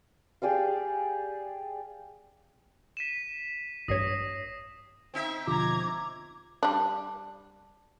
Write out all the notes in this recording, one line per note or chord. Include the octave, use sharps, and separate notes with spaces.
G4 G#4 D5 F5
B6 D#7 E7
A1 G2 C#5 D#6 A#6 C7
C4 D#4 E5
E1 D3 F3 A#5 D6 G#6
G3 D4